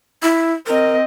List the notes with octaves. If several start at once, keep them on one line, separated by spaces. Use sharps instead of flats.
E4
C4 A#4 D#5